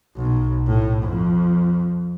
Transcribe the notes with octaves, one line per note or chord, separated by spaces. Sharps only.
B1
A2
F2